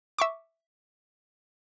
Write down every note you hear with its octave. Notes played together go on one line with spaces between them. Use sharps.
E5 C#6 D6